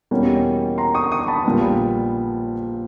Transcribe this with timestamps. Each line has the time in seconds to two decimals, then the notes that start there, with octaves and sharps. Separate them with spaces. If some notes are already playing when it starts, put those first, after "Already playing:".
0.11 E2 B2 G3 A#3 C#4
0.78 A#5 C6
0.94 C#6 D#6
1.12 C#6 D#6
1.28 A5 B5
1.45 A#1 A#2 G3 B3